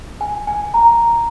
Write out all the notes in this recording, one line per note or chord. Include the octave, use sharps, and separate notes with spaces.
G#5
G#5
A#5